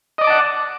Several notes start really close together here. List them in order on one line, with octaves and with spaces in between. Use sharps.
D#5 D5 D6 A5 F#5